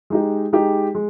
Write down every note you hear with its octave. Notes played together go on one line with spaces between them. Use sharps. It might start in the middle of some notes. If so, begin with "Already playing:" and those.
G#3 D#4 G4
G#3 D#4 G4
G#3